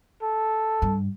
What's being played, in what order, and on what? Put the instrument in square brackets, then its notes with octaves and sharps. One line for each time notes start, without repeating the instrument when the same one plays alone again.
[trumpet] A4
[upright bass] G2